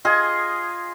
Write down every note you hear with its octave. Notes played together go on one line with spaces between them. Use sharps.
F4 G#4 D#5 G#5